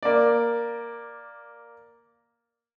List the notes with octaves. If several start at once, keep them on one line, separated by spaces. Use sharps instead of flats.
A#3 D5